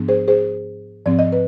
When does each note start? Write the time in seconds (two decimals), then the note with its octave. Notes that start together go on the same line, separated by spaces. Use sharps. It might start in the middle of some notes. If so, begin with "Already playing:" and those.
Already playing: G#2 F3 B3 D4
0.08 G#4 C5
0.28 G#4 C5
1.06 G#2 F3 C4 D5
1.19 D#5
1.32 B4